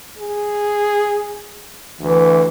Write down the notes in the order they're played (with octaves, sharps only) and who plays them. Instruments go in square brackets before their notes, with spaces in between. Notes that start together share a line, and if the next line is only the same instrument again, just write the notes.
[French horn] G#4
[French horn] D2 [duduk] E3